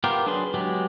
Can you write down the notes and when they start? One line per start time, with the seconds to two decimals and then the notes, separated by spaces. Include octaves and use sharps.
0.04 B3 F4 G4 A#4
0.26 F#3 D4 G#4 B4 C6
0.54 F#3 G#3 B3 G4